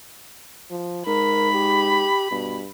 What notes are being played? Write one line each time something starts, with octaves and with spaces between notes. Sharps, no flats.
F3
G#2 A#4 B5
G4
G2 B2